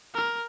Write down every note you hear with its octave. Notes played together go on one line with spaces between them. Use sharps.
A#4